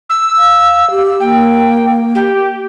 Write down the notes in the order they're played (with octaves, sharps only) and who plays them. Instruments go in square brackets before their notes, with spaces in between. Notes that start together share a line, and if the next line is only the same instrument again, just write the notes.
[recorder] E6
[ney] F5
G4
[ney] A#3 [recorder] G5
[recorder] G4